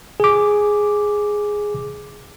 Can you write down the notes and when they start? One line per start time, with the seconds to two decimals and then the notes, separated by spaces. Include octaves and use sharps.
0.20 G#4 D6